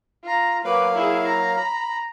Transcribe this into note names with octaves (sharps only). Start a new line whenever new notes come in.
F4 A#5
F#3 A#3 B4 F5 D6
E4 G#4
A#5
B5